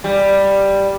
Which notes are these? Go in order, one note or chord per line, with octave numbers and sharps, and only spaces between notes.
G3